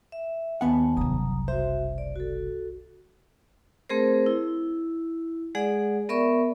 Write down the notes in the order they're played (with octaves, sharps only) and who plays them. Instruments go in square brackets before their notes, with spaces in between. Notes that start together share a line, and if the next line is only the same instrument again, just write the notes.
[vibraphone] E5
[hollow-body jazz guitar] D#2 B3 F#5 [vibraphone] G#5 A5
[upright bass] F#1 C2 [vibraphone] F#3 A#5 D#6
[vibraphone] F#4 E5 [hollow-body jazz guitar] C5
[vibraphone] D5
F#4 A4
A3 C4 G#4 A#4 C5
E4
G#3 G#4 D5 F#5
B3 A#4 D5 E5 B5 C#6